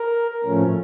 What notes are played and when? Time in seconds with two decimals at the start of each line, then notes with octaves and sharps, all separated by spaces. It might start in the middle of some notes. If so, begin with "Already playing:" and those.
Already playing: A#4
0.44 A2 F3 A3 C#4